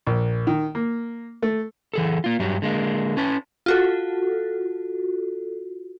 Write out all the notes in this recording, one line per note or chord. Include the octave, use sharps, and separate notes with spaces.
A#1
D#3
A#3
A3
E3 G#4 A4
A#3 F4
G2 F#3 G3
D3 G#3 A#3
C#4 B4 A5
F4 F#4 A4